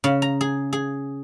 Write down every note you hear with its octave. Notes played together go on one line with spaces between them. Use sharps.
C#3
A#5
G#4
G#4